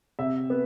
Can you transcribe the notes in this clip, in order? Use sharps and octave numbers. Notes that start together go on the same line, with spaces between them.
C3 E5
B3